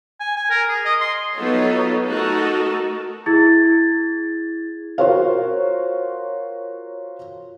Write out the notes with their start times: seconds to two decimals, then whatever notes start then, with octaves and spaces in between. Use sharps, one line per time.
0.20 G#5
0.37 G#5
0.50 A#4
0.69 G#4
0.85 D#5
1.01 C6
1.34 F#3 B3 D#4 F4 A4 C#5
2.06 A3 D#4 F#4 A4 A#4
3.26 E4 G#4 G#6 A6
4.98 F4 F#4 A#4 C5 C#5 F5